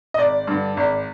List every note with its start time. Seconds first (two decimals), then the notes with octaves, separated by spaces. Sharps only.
0.14 D#5
0.18 G#1 D5
0.47 G2 D3
0.77 G#1